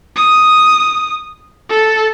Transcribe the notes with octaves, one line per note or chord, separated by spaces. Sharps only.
D#6
A4